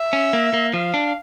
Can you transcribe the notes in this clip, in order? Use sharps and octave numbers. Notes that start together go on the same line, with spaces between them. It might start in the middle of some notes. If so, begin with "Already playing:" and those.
Already playing: E5
C#4
A#3
A#3
F3 F5
D4